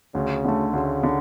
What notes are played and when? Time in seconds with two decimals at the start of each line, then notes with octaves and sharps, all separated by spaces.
0.14 D2 C#3
0.45 D3 A3
0.73 D2 C#3
1.03 D3